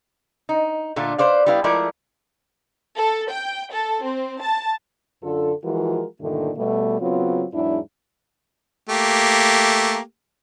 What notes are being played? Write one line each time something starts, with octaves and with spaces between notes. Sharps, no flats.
D#4
A#2 D3 A3 F4
B4 C5 D5 F5
G3 B3 E4 B4 F5
F3 G#3 A3 E4 A#4 D5
A4
G5
A4
C4
A5
F#2 D3 F4 A4
E3 F3 G#3 F4 F#4 A#4
G2 A#2 D3 D#3 A3
B2 G3 A3
C#3 F#3 B3 C4 F4
E2 G#2 F#3 D4 E4
A3 A#3 G4